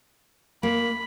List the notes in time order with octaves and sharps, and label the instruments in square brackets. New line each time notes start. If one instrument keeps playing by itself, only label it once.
[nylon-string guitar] A#3 [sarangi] B5